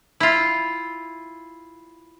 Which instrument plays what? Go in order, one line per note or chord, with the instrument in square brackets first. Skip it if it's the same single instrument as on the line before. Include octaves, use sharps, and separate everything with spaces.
[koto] E4 F4